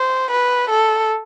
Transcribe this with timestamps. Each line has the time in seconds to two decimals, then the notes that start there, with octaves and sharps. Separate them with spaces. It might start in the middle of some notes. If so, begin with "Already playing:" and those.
Already playing: C5
0.31 B4
0.70 A4